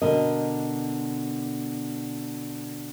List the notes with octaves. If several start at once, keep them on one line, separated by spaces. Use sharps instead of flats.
B2 D3 A#4 D#5